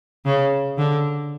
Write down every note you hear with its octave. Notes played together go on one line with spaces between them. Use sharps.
C#3
D3